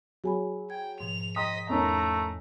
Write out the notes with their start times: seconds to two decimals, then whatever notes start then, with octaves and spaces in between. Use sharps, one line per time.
0.24 F#3 G#4 G#5 B5
0.70 G5 G#6
1.00 G#2 B2 F3 F7
1.36 D#5 G5 A#5 C6 D#6 B6
1.70 E2 A3 C#4 D#4 A#4 A#5